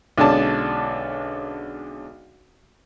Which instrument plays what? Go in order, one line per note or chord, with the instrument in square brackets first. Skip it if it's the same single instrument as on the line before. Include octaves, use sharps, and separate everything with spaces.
[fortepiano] B1 D3 G#3 C#4 D5 A5